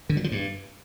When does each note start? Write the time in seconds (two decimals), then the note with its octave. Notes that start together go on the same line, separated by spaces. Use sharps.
0.09 D3
0.17 F#3
0.24 F3
0.32 G2